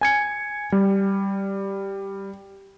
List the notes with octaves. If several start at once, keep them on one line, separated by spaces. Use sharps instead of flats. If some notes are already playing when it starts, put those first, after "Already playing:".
G#5 G#6 C#7
G3